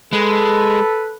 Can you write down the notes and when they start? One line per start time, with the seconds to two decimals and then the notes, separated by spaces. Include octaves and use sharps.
0.13 G#3 A4 B4